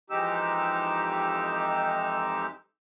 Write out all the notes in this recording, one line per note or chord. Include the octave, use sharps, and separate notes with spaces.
F2 E3 G#3 D#4 G4 E6